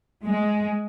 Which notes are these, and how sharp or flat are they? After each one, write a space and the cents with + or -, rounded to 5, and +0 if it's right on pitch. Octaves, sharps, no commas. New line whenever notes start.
G#3 +10